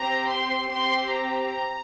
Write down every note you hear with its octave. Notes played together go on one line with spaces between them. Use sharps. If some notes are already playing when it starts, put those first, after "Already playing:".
Already playing: C4 G4 A#5
C6
C4 G4 C6
A#5